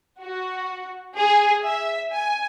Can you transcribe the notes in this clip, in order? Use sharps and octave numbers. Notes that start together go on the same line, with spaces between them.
F#4
G#4
E5
G#5